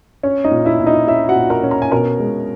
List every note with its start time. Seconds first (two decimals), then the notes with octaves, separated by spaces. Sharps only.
0.23 C#4 C#5
0.44 D#4 D#5
0.51 A#2
0.65 E4 E5
0.80 A#2
0.86 D#4 D#5
1.07 C#4 E4 E5
1.28 F#4 F#5
1.36 A#2
1.50 A#4 A#5
1.63 C#4
1.71 A#5
1.82 G#5
1.91 B2 A#4 A#5
2.20 G#3